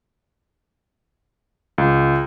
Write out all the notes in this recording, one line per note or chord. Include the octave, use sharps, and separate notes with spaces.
C#2